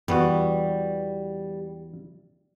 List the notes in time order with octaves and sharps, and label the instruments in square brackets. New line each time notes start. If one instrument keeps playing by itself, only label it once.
[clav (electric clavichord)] E2 B3 F#4 [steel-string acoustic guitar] G3